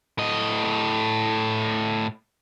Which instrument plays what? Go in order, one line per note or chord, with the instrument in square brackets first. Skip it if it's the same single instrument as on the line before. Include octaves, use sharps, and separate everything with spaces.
[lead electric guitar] A2 D#5